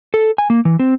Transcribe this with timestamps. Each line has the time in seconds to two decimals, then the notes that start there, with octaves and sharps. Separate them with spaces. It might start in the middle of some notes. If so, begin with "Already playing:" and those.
0.14 A4
0.38 G#5
0.50 A#3
0.65 E3
0.79 C4